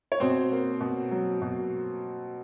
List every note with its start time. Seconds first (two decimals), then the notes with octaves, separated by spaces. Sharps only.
0.12 C#5
0.20 B2 C4 C5
0.51 A#3
0.80 B2
1.11 F#3
1.42 B2